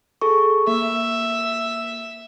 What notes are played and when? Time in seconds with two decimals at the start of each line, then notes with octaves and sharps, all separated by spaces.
0.21 G#4 A4 C#6
0.67 A#3 E5